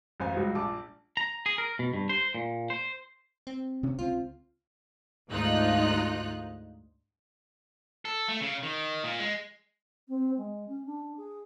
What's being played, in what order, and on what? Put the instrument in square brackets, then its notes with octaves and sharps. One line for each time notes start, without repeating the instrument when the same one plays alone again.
[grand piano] A1 F#2 C5 F5 G#5
C#2 G2 F#3 G#3
A#1 A5 D6
[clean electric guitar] A#5
G#4
A#4
B2
G2
C5
A#2
C5
[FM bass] C4
[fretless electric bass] C3 C#4
[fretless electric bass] C#2 C4 [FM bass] F4
[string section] D2 G#2 D#4 F4 F#6
[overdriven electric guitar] A4
A3
C#3
D#3
A#2
G#3
[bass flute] C4
G#3
C#4
D4
G#4